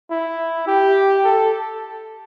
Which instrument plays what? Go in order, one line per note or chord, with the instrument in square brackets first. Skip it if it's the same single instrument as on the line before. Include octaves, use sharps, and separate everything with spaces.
[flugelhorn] E4
G4
A4